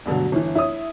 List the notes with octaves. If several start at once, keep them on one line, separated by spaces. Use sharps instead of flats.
G2 B2 D3 F#3
G1 E3
E4 C#5 D#6